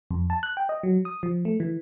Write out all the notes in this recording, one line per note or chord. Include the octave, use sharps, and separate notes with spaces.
F2
A5
F#6
G5
D#5
F#3
D#6
F3
A3
E3